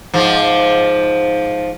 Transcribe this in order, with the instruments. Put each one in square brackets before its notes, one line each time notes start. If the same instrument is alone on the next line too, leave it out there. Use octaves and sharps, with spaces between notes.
[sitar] G#2 F3